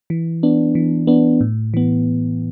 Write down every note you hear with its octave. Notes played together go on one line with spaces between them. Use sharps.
E3
B3 D4
E3
B3 D4
A2
E3 B3